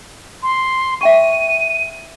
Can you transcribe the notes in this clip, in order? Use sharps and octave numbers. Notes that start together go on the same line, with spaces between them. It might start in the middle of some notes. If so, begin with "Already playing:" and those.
C6
E5 G5 C#6 D#7